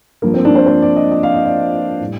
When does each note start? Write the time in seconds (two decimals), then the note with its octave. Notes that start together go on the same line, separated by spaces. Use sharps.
0.22 G2 F3 A#3
0.34 C4
0.45 D4
0.55 C5
0.66 C5
0.82 D5
0.96 D#5
1.11 D#5
1.23 F5
1.34 D#5
1.45 D5
2.00 A2 G3